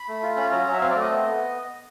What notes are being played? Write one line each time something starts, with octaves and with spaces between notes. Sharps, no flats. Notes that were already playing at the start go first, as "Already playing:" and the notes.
Already playing: B5
A3
F4
C#4
F#3 A#5
F#3
E5
C4 F5
D5
A3
D#5
B3
B3